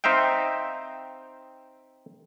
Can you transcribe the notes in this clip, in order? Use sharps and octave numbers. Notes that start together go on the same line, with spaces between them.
C4 D#4 E5 F5 G5